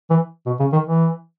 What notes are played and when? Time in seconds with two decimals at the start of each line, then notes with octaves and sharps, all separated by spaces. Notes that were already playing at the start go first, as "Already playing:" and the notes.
0.10 E3
0.46 B2
0.60 C#3
0.72 D#3
0.86 E3